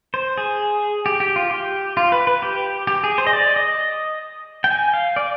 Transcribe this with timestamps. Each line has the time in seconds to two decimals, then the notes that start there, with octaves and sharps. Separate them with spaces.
0.14 C5
0.38 G#4
1.06 G4
1.20 G4
1.36 F4
1.51 G4
1.97 F4
2.12 B4
2.27 B4
2.42 G4
2.87 G4
3.04 G#4
3.18 C5
3.27 D#5
3.33 D5
3.56 D#5
4.64 G5
4.70 G#5
4.94 F5
5.16 D5